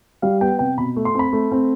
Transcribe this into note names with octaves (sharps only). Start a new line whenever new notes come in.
G3 F5
B3 G5
C3 G5
B2 B5
A3
C6
C4 B5
A3
C4